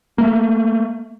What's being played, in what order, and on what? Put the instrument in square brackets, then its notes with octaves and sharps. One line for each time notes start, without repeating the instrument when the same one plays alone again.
[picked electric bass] A3 A#3